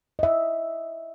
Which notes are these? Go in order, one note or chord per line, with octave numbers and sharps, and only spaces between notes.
D#5 E5